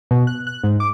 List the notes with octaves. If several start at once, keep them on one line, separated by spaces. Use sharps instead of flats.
B2
F#6
F#6
G#2
D6